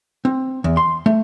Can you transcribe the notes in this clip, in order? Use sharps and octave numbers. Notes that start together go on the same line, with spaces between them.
C4
E2
C6
A3